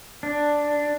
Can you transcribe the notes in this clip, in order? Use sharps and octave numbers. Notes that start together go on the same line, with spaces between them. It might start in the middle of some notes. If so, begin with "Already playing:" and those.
D4